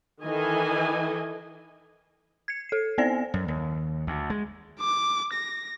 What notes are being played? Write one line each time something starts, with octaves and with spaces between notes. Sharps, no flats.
D#3 E3 A4 D#5 G#5
G#6 C#7
A4 C7
B3 C4 C5 D5 G#5 A#6
F#2
D#2
D2
G#3
D6
A#6